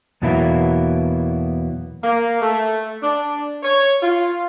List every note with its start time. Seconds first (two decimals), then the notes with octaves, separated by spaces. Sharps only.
0.22 E2 B2 F#3 A#3 B3 E4
2.03 A#3
2.41 A3
3.02 D4
3.63 C#5
4.02 F4